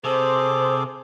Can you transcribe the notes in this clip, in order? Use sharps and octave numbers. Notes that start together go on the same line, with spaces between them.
C3 G#4 A4 C5 D6